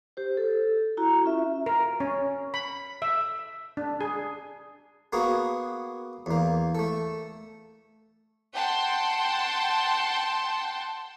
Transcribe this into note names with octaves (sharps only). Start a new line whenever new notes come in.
G4 C5
A4
E4 F#4 A#5
C#4 F4 E5
A#4
C#4
B5
E5
D4
G#4
A#3 B3 F#4 G#4
E2 A#3
A3 A4
F#5 G5 A5 C6